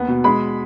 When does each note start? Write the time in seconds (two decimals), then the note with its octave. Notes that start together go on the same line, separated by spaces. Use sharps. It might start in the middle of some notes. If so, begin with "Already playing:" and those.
Already playing: D#2 B3
0.08 B2
0.24 G#3 B5